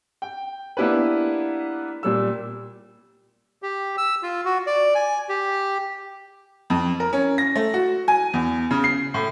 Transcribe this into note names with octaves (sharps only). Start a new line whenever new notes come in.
G5
A#3 B3 D4 E4 G4 B4
A#2 G3 E6
G4
E6
F4
F#4
D5
G#5
G4
F2
A#4
C#4
A#6
A3
F#4
G#5
E2
C#3
C7
A2